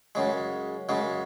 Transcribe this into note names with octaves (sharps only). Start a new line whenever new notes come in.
F#2 C#3 G#3
F#2 C#3 G#3